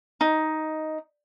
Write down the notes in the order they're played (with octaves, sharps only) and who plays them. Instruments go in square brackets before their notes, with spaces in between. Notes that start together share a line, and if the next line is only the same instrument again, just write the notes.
[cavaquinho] D#4